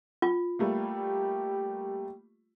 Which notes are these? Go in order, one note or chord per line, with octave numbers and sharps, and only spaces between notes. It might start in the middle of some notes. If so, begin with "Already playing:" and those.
F4
G3 A3 A#3 G4